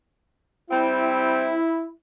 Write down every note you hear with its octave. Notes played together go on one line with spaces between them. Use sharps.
G3 C4 E4